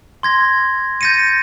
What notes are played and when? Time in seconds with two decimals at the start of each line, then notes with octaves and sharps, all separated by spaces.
0.23 C6 G#6 A#6
1.01 G6 A6 A#6 C#7 D#7